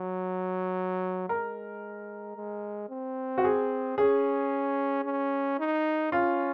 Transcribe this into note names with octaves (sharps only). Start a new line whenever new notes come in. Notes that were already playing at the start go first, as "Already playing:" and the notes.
Already playing: F#3
G#3 A#4
G#3
C4
F#4
G#4
C#4 G#4
C#4
D#4
C#4 F4